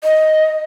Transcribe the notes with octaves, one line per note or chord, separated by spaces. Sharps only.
D#5